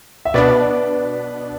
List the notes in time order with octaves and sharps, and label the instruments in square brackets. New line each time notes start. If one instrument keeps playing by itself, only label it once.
[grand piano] E5
[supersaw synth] B2 B3 D4 [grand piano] B4 D5